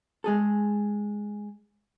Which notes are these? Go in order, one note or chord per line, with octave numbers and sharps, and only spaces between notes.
G#3 G#4 A4